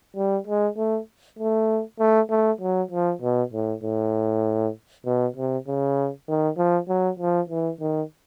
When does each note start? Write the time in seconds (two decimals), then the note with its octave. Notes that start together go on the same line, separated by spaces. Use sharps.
0.16 G3
0.47 G#3
0.77 A3
1.39 A3
1.99 A3
2.30 A3
2.61 F#3
2.91 F3
3.22 B2
3.53 A2
3.84 A2
5.05 B2
5.36 C3
5.67 C#3
6.28 D#3
6.57 F3
6.88 F#3
7.19 F3
7.50 E3
7.80 D#3